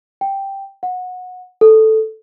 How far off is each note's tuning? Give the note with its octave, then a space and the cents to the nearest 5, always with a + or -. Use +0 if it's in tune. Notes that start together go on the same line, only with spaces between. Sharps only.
G5 +0
F#5 -20
A4 -5